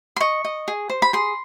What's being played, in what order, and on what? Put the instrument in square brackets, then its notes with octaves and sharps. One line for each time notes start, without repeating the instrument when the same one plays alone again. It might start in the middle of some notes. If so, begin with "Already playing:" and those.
[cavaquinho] C6
D#5 C#6
D#5
G#4
C5
B5
G#4 C6